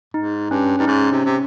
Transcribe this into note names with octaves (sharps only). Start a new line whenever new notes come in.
G#2 D#4
G2 C#4
G2 D#4
G#2 C#4
C3
C3